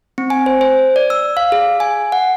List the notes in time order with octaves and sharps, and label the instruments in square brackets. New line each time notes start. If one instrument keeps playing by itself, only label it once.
[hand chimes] C4
G#5
C5
C5
D5
E6
F5
G#4
G#5
F#5